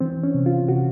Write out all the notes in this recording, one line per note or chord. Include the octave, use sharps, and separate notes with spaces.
E3 C4
C#4
C3
F4
C3 F#4